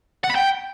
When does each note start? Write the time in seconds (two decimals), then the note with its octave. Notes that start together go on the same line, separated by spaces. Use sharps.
0.24 F#5
0.30 B5
0.35 G5